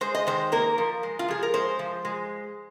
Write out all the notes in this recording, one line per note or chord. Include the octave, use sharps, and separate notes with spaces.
G#3 C5
D#5
D#3 C5
A#3 A#4
F3
G#3
F4
F3 G#4
A#4
G#3 C5
F3
G#3